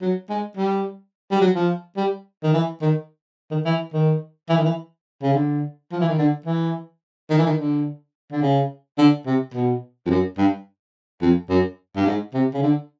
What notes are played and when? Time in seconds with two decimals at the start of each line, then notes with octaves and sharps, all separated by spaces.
0.01 F#3
0.29 G#3
0.57 G3
1.31 G3
1.41 F#3
1.55 F3
1.97 G3
2.43 D#3
2.53 E3
2.81 D#3
3.51 D#3
3.65 E3
3.93 D#3
4.49 E3
4.57 D#3
4.64 E3
5.23 C#3
5.34 D3
5.92 F3
6.01 E3
6.09 D#3
6.18 D3
6.46 E3
7.30 D#3
7.38 E3
7.46 D#3
7.58 D3
8.32 D3
8.42 C#3
8.98 D3
9.26 C3
9.54 B2
10.06 F2
10.10 F#2
10.38 G2
11.22 F2
11.49 F#2
11.96 G2
12.06 G#2
12.34 C3
12.54 C#3
12.62 D3